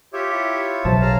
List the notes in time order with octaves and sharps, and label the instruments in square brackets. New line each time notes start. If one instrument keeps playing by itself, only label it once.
[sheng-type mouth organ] F4 C#5 E5 [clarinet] G4
[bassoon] E4
[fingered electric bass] B1 B2 F#3 [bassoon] C5 [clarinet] A5
[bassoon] C#3 [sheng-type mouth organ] F5 A#5